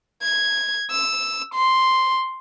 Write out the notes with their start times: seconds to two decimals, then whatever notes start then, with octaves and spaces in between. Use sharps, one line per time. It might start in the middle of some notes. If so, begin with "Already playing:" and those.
0.23 G#6
0.91 E6
1.54 C6